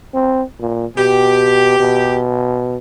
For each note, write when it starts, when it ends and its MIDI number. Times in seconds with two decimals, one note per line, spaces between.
0.14 0.42 60
0.60 0.85 46
0.97 1.75 47
0.97 2.17 67
1.80 2.77 47